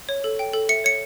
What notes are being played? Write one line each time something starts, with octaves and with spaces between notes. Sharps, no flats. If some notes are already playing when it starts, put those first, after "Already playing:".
C#5
A4
G5
A4
E5 C#7
C#5 C#7